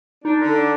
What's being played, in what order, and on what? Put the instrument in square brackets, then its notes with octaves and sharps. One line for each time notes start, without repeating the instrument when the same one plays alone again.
[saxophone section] D4 [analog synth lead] D#4
[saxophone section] D3
D4